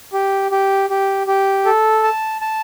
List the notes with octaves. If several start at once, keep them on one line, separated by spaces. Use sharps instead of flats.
G4
G4
G4
G4
A4
A5
A5